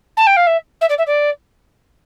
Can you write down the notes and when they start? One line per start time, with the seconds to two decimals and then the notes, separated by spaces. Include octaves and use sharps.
0.17 A5
0.27 G5
0.36 F5
0.46 E5
0.81 E5
0.89 D5
0.98 E5
1.07 D5